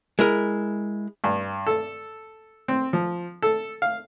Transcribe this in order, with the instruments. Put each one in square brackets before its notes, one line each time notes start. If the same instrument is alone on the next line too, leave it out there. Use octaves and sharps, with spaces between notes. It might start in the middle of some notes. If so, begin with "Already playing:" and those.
[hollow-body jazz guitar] G#3 E4 A#4
[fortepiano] G2
A4
C4
F3
A4
F5